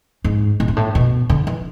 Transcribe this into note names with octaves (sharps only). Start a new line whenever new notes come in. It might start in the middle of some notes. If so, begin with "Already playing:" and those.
G#2
A2
G#2
A2
B2
D3
E3